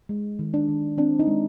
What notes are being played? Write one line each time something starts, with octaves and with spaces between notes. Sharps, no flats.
G#3
D#3
D4
D#3
C4 D4
D#4
G#3